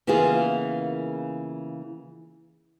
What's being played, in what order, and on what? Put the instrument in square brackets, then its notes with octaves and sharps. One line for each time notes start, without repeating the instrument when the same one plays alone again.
[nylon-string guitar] C#3 E3 A#3 B3 F4 G#4